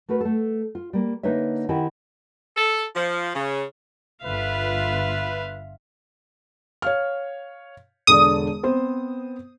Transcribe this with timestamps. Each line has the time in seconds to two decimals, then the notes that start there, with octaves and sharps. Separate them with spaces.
0.09 A3 F#4 A#4 B4
0.21 A3 A4
0.75 F4
0.93 G3 A#3
1.23 D3 A#3 D#4 B4 C#5 E5
1.69 D#3 C4 E4 G4 F#5 G#5
2.57 A4
2.95 F3
3.35 C#3
4.24 G1 F4 B4 E5 F5
6.82 C#5 F5 F6
8.07 E1 D3 D5 D#6
8.63 B3 C4 C5